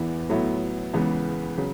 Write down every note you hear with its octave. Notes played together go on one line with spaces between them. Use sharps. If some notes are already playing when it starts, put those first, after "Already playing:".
Already playing: E2 E3 B3 E4
A2 F#3 B3 E4
C#2 C#3 E3 B3
C#3 F#3